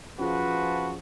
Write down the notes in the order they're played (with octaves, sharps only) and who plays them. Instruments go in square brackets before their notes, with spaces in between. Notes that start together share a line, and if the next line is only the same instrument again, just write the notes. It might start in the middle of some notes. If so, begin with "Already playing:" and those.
[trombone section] F3 [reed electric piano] C#4 F4 G#4 [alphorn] F#4 [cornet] B4